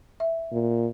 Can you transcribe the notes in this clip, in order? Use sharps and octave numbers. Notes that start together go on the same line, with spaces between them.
E5
A#2